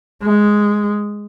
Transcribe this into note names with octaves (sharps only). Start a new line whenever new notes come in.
G#3